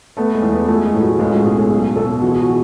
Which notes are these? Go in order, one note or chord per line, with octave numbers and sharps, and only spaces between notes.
A3 B3
G#3
E2
B3
A3 G#4
G#3
A2
F#3
C#2 G#3
F#4
B2 G#4
A4
B1 G#4
B2 A4
E3 F#4
G#4
F#4
E3